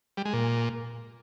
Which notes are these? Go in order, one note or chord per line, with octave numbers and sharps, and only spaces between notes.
G3
G#3
A#2